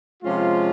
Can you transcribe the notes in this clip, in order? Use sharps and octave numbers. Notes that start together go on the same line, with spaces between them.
C3 F3 G#3 C#4 F4